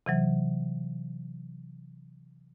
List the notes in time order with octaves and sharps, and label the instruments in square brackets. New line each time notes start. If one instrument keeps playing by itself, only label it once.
[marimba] C3 E3 F#3